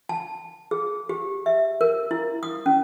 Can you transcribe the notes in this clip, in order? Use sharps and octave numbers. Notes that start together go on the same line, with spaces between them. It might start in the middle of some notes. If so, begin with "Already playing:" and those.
A5
G#4
G4
E5
A#4
E4
D#6
C#4